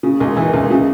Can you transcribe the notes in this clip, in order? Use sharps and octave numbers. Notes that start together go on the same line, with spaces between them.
C#3
C#2
E3
C#2
C#3